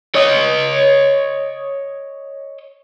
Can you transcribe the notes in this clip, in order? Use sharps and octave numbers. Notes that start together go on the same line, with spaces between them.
C#5 D#5